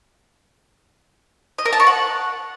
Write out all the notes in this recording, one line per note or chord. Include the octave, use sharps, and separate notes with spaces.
D#5
A#4
A5
C#6
F#5